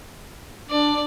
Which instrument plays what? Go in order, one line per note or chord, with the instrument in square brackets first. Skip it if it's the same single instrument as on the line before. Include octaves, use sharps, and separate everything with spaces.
[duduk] D4 [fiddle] D5